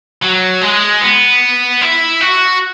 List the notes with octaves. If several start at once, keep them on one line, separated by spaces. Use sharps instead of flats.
F#3
G#3
B3
E4
F#4